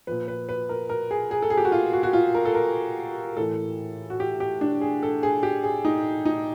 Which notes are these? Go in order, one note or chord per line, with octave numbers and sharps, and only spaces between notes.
A#2 F3 B4
B4
B4
A#4
A#4
G#4
G#4
A4
G#4
G4
F#4
F4
F#4
F#4
F4
A#4
A4
A#4
A2 E3 A4
F#4
G4
G4
D4
G#4
A4
G#4
G4
G#4
D#4
D#4